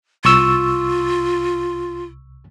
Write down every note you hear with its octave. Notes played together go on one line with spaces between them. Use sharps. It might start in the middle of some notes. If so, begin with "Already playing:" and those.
C2 F4 C#6 E6